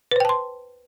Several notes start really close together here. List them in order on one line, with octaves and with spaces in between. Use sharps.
B4 C5 G5 A5 C6